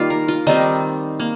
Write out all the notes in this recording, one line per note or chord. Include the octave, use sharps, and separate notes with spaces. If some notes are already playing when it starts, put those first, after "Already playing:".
Already playing: D#3 G3 A#3 F4
A#4
F4
D#3 G3 C4 D#4
A#3